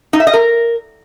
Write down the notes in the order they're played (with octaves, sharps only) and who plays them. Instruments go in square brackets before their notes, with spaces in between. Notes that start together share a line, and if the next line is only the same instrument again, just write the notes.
[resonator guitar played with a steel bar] D#4
E5
D#5
A#4